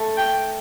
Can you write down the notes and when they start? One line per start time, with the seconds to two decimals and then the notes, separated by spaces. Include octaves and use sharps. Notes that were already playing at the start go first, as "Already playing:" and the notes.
Already playing: A3
0.17 G5